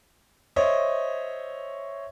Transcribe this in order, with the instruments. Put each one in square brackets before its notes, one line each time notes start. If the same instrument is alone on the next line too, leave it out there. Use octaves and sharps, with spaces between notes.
[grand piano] C5 C#5 D#5 E5